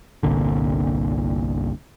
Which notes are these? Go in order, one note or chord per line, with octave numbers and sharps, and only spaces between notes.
G1 C2 A#2 D3